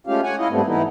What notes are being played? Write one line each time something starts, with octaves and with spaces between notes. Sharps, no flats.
G#3 A3 C#4 F4 G4 F5
C#5 F#5 G#5
E4 F4 D#5
G#2 G3 A3 B3 C4
E3 B3 D#4 E4